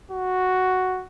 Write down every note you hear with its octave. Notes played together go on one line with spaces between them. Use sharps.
F#4